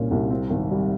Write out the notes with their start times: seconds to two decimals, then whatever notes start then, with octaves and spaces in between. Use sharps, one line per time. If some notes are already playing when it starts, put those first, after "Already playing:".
Already playing: C2 A#2 C#4
0.11 C2
0.30 C4
0.50 G#1
0.71 G3